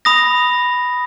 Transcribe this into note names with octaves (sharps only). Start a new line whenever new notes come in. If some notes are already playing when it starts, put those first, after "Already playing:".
B5 D#6 A#6